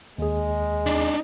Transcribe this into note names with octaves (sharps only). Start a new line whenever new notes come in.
D#2 G#3 G#4
D4 D#4